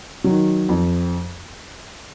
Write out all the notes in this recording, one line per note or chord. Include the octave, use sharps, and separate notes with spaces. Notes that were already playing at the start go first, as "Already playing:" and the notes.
D#3 F#3
F2